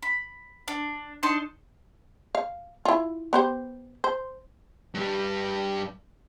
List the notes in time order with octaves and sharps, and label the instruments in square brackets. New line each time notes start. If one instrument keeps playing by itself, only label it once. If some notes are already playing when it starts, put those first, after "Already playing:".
[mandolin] B5
D4
D4 D#4 A5 C6
[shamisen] F5
E4 F4
B3 G4 C5
C5
[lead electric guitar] G2 G3